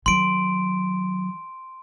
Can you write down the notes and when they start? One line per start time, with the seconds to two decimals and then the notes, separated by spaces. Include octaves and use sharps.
0.06 D#3 F#3 C6 D7